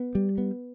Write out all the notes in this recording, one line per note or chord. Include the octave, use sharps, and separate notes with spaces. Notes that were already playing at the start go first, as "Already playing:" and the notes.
Already playing: B3
G3
B3